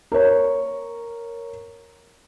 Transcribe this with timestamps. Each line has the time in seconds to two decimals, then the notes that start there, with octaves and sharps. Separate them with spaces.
0.12 A#4 C#5